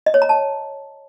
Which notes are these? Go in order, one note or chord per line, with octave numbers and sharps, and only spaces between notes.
D#5
C#5
A#5
A5